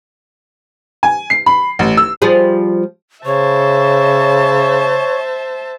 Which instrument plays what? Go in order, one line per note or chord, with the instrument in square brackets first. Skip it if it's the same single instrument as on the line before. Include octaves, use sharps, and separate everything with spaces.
[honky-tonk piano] G#5
C7
B5
A1
E6
[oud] F3 G3 G#4
[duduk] C#3 [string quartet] C5 E5 A5 [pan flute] C#5 [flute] C#6